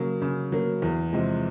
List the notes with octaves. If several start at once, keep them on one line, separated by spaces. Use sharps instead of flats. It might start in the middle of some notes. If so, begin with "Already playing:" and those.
Already playing: C#3 F#3 A#3
C#3
F#3 A#3
E2
C3 F3 G#3